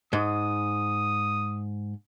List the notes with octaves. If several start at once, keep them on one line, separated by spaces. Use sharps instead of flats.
G#2 D#6